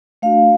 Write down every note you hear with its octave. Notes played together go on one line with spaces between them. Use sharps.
A3 D4 F#4 F5